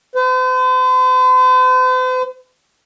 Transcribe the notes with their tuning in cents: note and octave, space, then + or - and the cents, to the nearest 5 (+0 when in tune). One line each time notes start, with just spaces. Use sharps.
C5 -45